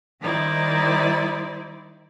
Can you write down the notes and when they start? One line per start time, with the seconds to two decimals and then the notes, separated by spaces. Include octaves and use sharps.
0.21 D#3 G3 D#4 E4 C5 D5